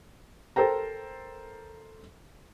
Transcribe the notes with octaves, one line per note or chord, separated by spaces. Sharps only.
A4 A#4 C5 G5 A#5